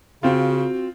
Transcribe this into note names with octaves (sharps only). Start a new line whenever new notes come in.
C#3 C4 F4 F#4